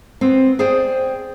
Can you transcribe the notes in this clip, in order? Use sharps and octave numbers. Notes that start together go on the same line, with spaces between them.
B3 C4
G#4 C5 D5 G5